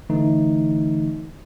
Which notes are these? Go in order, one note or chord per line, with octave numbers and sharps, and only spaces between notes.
D3 E3 A3 D#4